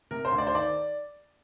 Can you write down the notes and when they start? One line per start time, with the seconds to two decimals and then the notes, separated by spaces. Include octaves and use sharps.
0.11 C3 A#4
0.25 C5
0.31 D2
0.38 D5
0.47 C5
0.52 D#3 D5